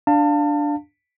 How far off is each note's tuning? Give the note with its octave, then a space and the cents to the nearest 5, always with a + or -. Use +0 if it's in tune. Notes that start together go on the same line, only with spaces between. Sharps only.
D4 +0 F5 +0 A5 +30